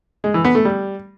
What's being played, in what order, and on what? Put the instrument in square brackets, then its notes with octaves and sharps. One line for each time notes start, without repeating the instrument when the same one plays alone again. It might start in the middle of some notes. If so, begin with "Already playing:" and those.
[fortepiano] G#3
E3
B3
A3
G3